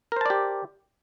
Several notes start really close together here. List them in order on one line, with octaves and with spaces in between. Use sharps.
A#4 C5 A5 D5 G4